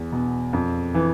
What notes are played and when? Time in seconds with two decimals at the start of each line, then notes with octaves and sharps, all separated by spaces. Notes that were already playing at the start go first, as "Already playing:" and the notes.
Already playing: E2
0.12 B2
0.53 F2
0.94 E3